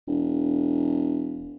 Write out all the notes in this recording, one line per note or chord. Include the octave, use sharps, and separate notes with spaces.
E1